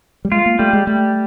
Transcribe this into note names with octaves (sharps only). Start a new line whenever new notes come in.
G3
G#3 F4
A#3
G3 A3
G#3
G3 A3